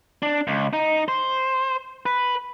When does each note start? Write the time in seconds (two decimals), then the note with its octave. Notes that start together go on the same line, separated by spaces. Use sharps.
0.23 D4
0.48 C#2
0.73 D#4
1.08 C5
2.06 B4